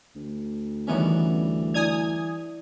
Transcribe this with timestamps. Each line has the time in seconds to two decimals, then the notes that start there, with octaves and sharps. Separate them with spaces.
0.15 D2
0.87 D#3 E3 G3 B3 C#4
1.74 E4 D5 G#5 D#6 G#6 F7